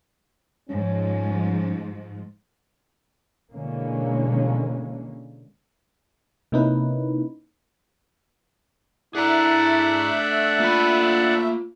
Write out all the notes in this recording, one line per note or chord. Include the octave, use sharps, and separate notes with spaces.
G#2 F3 C#4
B2 D3 E3 G#3 A#3 C#4
C3 A#3 C#4 D#4 E4 B4
A3 D4 E4 G#4 D5 E5 F#5 A#5
A#3 F4 B5